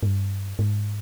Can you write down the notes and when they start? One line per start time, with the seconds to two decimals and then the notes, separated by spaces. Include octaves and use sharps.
0.03 G#2
0.07 G2
0.59 G#2